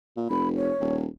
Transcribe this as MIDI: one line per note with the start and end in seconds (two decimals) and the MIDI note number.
0.17 0.29 46
0.30 0.72 29
0.30 0.48 83
0.57 0.96 73
0.80 1.07 27